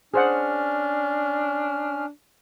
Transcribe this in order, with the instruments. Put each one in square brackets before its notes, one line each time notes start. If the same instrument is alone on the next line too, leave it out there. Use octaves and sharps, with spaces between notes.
[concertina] C#4 F6 [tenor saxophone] D4 [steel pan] G#4 C5 F#5